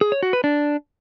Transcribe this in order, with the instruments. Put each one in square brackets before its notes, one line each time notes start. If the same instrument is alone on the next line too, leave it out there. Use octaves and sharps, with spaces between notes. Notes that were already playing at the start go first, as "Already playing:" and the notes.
[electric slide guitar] G#4
C#5
F#4
B4
D4